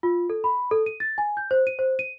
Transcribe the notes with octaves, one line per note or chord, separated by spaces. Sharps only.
F4
A4
B5
A4
D#7
A6
G#5
G6
C5
D#7
C5
D#7